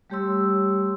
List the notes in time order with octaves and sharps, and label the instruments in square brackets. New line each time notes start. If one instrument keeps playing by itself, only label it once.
[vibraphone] G3 A3 G4 C#5 C6 E6